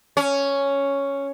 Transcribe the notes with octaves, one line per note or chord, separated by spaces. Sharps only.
C#4